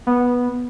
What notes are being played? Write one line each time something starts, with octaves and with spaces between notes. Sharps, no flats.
B3